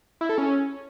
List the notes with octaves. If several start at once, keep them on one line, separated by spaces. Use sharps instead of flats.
E4
A4
C#4